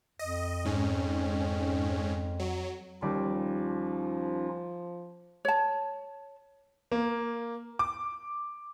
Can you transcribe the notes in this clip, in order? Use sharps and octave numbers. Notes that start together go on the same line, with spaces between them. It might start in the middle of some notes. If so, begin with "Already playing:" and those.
F2 D#5
G#2 C#4
F#3
D#2 F3 G3 C#4 D#4 F4 D6
C#5 A5
A#3
D6